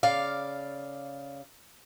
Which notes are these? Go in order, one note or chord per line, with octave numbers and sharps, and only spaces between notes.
C#3 D5 F5